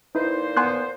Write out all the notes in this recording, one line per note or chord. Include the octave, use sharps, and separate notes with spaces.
A#2 D#4 E4 B4 C5
B3 G#5 C6 F#6